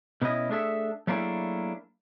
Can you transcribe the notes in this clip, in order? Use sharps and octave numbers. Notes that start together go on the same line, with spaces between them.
B2 B3 C#4 E4 D#5
A3 D4 G#4 A4 E5
F#3 A3 A#3 D4 E4 G#4